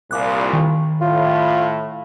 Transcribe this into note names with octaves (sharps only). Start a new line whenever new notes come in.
C2 A#2 D6 F#6
D#3
A2 F4